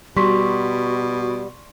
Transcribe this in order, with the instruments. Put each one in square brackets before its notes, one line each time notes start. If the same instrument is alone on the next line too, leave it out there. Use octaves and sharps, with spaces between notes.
[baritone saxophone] B2 [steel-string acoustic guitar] G3 [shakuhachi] F#4 [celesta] C6 C#6 B6